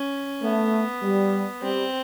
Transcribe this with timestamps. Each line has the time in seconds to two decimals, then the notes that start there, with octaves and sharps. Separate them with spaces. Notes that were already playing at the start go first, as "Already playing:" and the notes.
Already playing: C#4
0.42 A3 B3
1.02 G3
1.62 G3 C4